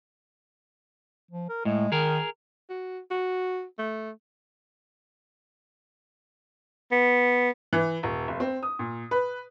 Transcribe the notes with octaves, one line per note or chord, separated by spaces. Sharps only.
F3
A#4
A2 G#3
D#3 G#4 A#4
F#4
F#4
A3
B3
E3
D#1
F1
C4
D#6
A#2
B4